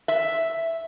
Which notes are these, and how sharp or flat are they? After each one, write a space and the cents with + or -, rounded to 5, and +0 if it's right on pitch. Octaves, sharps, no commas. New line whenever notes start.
E5 +0